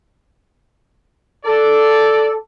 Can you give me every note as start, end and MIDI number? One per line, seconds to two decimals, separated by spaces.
1.45 2.33 69
1.45 2.33 74